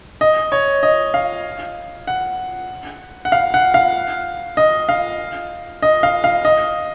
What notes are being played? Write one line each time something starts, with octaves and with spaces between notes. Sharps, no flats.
D#5
C#5
D#5
F5
F#5
F#5
F5
F#5
F5
D#5
F5
D#5
F5
F5
D#5